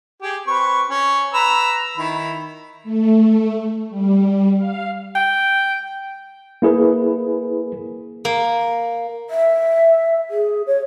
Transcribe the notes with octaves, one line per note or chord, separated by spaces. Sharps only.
G4 G#4
C4 B4 C#6
C#4
B4 A#5 E6
D#3 E4 B5
A3
G3
F5
G5
A#3 E4 G#4 A#4 B4
A#3
E5
G#4
C#5